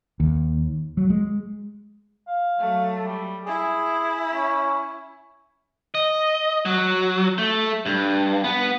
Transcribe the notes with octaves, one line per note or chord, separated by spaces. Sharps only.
D#2
F#3
G#3
F5
F#3 A3
G3
E4 G#4
C#4
D#5
F#3
A3
G2
B3